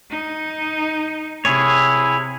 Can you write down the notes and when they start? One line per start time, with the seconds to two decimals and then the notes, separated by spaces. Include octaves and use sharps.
0.10 D#4
1.45 C3 E4 G#4 C#5